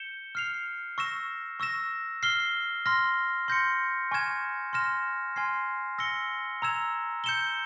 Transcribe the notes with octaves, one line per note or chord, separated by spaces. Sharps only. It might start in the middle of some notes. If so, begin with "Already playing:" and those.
Already playing: G6 C#7 E7 G7
F6 C7 F7
C#6 E6 A#6 E7
C#6 E6 A#6 E7
F6 C7 G7
C6 F6 A#6
C6 G6 A#6 C#7
G#5 C#6 F6 G#6 E7
C6 F6 A#6 E7
G#5 C6 F6 G#6 C7
E6 A#6 C#7 G7
A#5 E6 G#6 E7
G6 C#7 E7 G7